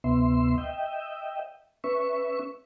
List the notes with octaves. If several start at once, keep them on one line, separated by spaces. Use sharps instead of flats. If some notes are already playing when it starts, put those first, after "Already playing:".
D2 C3 B3 E5 C6
D#5 E5 G5
C#4 B4 E5 C#6